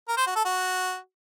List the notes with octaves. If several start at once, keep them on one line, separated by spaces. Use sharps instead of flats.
A#4
C5
F#4
A4
F#4